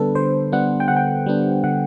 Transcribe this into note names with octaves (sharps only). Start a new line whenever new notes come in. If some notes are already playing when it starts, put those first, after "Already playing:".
Already playing: D3 G3 B3 D4 A4 B4
D3 C5
G3 B3 D4 F#5
G5
D3 F#5
G5
G3 B3 D4
D3 F#5